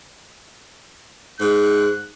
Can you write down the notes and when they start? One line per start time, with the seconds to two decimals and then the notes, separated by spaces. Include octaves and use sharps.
1.40 G#2 F#6